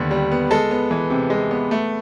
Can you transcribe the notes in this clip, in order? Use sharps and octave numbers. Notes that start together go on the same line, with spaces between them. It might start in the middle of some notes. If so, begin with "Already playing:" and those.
Already playing: D#2 D3 G3 B3
G3
B3
G#3 A4 A5
B3
E3
C3
G#3
B3
A3